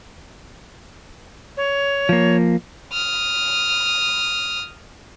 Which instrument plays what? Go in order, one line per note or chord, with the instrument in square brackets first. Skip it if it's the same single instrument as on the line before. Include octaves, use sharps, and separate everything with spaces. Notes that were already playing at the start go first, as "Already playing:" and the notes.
[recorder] C#5
[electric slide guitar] F3 A#3
[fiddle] D#6 F6